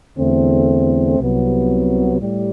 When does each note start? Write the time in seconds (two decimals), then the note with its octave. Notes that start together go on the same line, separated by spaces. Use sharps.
0.16 E2 D3 A3 C4
1.18 C2 C3 F#3 B3
2.20 A2 G3